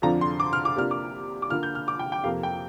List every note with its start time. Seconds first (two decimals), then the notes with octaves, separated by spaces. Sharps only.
0.02 F2 D3 F3 D4 F4 A#5
0.21 C6
0.40 D6
0.53 F6
0.65 D6
0.76 C3 A#3 D4 F4 F6
0.91 D6
1.42 D6
1.50 D3 A#3 F4 F6
1.63 G6
1.75 F6
1.88 D6
1.99 G5
2.12 G5
2.24 F2 C3 F3 A#3 F5
2.43 G5